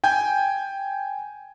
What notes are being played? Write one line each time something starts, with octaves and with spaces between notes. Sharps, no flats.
G5 G#5 G6